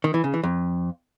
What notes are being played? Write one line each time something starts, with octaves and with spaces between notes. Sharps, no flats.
D#3
E3
C#3
E3
F2